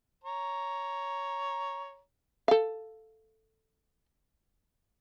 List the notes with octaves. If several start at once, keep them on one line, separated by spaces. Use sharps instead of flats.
C#5 A#5
A4 F5